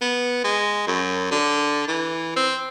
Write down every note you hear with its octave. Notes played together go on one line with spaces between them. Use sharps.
B3
G#3
F#2
D3
E3
C4